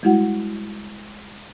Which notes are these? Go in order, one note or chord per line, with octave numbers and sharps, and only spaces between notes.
G3 G#3 E4 F#4 F#5